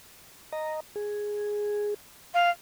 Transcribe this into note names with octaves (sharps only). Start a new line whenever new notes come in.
D#5 A#5
G#4
F5